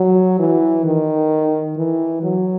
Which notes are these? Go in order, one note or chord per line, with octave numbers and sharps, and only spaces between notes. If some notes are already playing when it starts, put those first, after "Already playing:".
Already playing: F#3
E3
D#3
E3
F#3